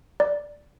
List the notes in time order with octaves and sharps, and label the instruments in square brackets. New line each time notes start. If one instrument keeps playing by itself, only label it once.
[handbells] D5